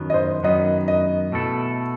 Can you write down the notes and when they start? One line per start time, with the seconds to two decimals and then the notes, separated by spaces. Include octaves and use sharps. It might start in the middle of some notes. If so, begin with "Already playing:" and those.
Already playing: F#2 D#3 F#3 B3
0.10 D#5
0.14 C5
0.44 F#2 D#3 F#3 B3 D#5
0.88 D#5
1.32 B2 A3 E4 A4